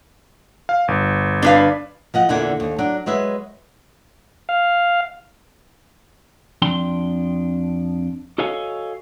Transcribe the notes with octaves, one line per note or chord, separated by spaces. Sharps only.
F5
G1
D4 B4 F5
F3 D#5 F#5
E2 A#2 D3 E4 F#5 G#5
D#2
F#3 D4
F#3 G#3 B4 E5
F5
F2 D4 G5 C6
F#4 A4 C#5 D#5 F5 G#5